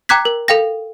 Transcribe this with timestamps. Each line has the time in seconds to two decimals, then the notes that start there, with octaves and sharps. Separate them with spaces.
0.09 G5 A#5 D6 F#6 G#6 B6
0.25 A#4
0.48 A4 F5 G5 A#6